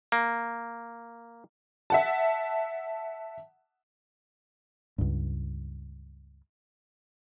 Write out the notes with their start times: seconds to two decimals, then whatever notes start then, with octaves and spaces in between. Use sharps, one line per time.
0.12 A#3
1.90 E5 F#5 A5
4.98 C#2 G2